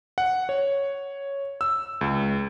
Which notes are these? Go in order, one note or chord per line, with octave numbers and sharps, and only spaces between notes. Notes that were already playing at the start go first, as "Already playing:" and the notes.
F#5
C#5
E6
C#2